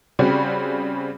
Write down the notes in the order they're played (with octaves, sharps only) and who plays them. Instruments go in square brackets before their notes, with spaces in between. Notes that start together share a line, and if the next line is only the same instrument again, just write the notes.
[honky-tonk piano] C#3 G3 C4 F#4